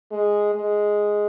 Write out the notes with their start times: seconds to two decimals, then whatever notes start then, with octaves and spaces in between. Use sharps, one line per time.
0.11 G#3
0.55 G#3